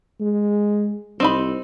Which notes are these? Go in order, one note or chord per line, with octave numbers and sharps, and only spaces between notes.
G#3
C2 C4 D#4 B5